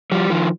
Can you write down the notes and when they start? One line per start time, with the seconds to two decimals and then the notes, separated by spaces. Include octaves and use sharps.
0.11 F3 G3
0.30 D#3 F3